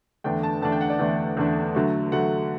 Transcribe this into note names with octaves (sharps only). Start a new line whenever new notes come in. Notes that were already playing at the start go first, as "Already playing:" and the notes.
E2 D3 A3 D4 G5
A5
E2 D3 A3 D4 A5
G5
F#5
D5
E2 D3 A3 D4
E2 D3 A3 D4
D3 F#3 A3
D3 F#3 A3 F#5